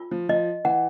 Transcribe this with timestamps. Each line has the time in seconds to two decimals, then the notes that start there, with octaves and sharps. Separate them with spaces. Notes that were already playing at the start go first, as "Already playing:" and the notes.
Already playing: F4
0.11 F3
0.29 F3 D#5
0.65 E3 F#5